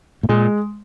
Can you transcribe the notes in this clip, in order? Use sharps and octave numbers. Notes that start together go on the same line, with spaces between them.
A2
A#2 G#3